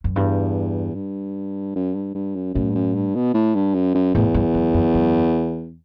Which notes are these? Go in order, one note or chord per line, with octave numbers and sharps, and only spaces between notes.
F#2
E2 G2
G2
F#2
G2
G2
F#2
F#2 A2
G2
F#2
G2
B2
A2
G2
F#2
F#2
E2 A2
G2
F#2
F#2
F#2